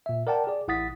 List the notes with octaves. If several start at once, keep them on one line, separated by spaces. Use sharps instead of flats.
A#2 E5
A#4 D5 F#5 G5 A5
G#4 D5
A1 E4 F#5 D#6 A6 B6